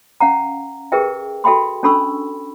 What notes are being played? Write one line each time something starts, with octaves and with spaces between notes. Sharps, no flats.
C#4 F5 F#5 A#5
G4 G#4 A#4 B4 E5 G5
F#4 A4 E5 G5 B5 C6
C#4 D4 A4 B5 C#6 E6